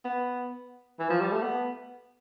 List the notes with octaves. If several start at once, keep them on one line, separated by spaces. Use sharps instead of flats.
B3
E3
F3
G3
A3
B3